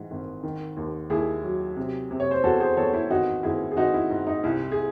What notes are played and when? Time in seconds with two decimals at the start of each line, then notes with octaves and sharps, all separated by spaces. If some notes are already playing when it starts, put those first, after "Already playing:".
Already playing: G#2 E3
0.11 G#1
0.43 D#3
0.77 D#2
1.10 D#2 E4 G#4
1.43 F#3
1.76 C3
2.11 C3
2.20 C#5
2.31 C5
2.43 E2 F#4 A4
2.60 G#4 C5
2.77 E2 A4 C#5
2.93 E4
3.10 G#1 D#4 F#4
3.43 G#1 E4 G#4
3.71 G#4
3.76 G#1 D#4 F#4
3.94 E4
4.10 G#2
4.27 D#4
4.44 C2 E4
4.72 G#4